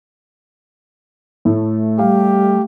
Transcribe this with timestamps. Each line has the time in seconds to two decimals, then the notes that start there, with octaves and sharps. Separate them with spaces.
1.45 A2 A3
1.99 G3 G4 F5